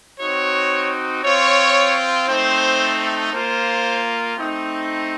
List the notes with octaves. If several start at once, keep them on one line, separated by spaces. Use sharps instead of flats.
C4 D#4 F#4 C#5
C4 F4 C#5
A3 C4 D#4 C5
A#3 F4 C5
A3 C4 D#4